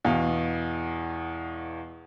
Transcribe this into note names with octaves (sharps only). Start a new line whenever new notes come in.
E2 B2 F5